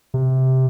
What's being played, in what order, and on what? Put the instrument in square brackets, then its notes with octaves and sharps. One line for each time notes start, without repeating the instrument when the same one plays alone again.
[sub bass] C3